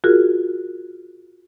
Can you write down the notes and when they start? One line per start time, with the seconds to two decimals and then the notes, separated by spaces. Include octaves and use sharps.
0.04 F4 F#4 G#4 A#4